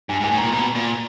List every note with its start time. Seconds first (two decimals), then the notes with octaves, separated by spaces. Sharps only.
0.09 G2 G#5
0.20 G#2
0.23 G#5
0.31 A2
0.38 A#2 A#5
0.52 B2 A#5
0.75 A#2